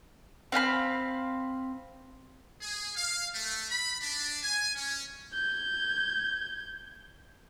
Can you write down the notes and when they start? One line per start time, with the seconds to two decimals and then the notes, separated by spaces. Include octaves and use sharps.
0.52 C4 F5 G5 B5
2.61 G#4
2.97 F5
3.34 A3
3.71 B5
4.01 D4
4.43 G#5
4.75 C#4
5.33 G6 G#6